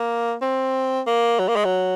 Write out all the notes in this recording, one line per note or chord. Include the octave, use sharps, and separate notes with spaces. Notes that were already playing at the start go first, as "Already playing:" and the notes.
Already playing: A#3
C4
A#3
F#3
A#3
G#3
F#3